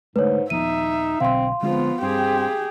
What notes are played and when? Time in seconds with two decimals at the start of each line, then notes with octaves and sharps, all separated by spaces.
0.16 G#2 D3 G#3 A3 B4 C#5
0.50 D#1 F3 B3 D#4 E5 D#7
1.20 B1 B2 D3 C4 F5 C6
1.63 D3 F3 G#3 B3 C4 F4
2.02 G2 C4 G4 G#4